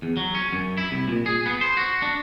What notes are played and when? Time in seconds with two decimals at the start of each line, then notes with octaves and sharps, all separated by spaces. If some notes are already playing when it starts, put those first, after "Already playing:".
0.02 E2
0.17 F#3
0.35 C#4
0.53 F#2
0.77 E4
0.91 C2
1.08 A#2
1.26 G#4
1.46 B3
1.61 C5
1.77 F#4
2.02 D4